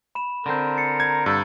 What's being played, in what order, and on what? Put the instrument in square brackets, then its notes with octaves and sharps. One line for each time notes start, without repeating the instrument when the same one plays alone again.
[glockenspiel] B5 E7
[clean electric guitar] D3 C4 [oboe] A#4 [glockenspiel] C6 G6
[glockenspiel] A6 C7 C#7
[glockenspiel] A#5 G6 [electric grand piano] G#6
[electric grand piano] G2 [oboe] A4